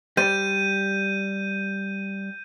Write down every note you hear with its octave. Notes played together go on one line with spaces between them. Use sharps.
G3 G4 C5 G6 D#7